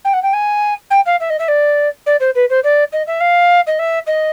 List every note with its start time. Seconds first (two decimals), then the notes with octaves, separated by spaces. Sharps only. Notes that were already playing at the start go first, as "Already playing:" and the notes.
0.04 G5
0.13 F#5
0.22 G5
0.33 G#5
0.90 G5
1.06 F5
1.20 E5
1.30 D#5
1.39 E5
1.48 D5
2.06 D5
2.20 C5
2.35 B4
2.49 C5
2.63 D5
2.92 D#5
3.07 E5
3.20 F5
3.67 D#5
3.79 E5
4.06 D#5